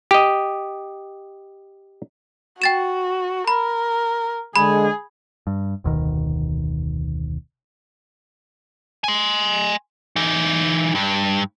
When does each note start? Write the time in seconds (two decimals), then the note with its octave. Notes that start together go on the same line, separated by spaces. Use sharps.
0.11 G4 D#5
2.62 F#4 G5 A6 E7
3.48 A#4 B5
4.56 D3 G#3 G#4 B5
5.47 G2
5.84 F1 D2 B2 D#3
9.04 G#5 C6
10.16 E3 D#4
10.95 G2